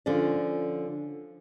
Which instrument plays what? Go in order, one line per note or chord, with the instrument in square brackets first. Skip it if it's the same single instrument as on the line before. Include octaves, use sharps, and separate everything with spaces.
[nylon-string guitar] D3 F3 C#4 D5